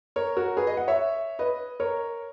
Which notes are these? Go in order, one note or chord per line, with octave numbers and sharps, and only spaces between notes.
A#4 C#5
F#4 A#4
G#4 B4
B4 D#5
D#5 F#5
C#5 E5
B4 D#5
A#4 C#5